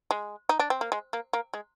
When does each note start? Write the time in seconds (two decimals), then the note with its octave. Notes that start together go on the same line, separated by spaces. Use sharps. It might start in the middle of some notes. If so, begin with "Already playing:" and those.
0.11 G#3
0.49 D#4
0.59 D4
0.70 C4
0.81 A#3
0.92 G#3
1.13 A#3
1.33 A#3
1.54 G#3